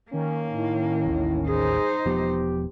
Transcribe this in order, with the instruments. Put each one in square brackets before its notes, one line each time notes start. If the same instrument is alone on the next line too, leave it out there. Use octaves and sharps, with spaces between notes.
[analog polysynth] D#3 C#4 [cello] A#3
[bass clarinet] A2
[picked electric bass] A1 D#2
[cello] D#4 C5 [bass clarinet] G#4
[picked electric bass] E1 F3 B3 [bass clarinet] G4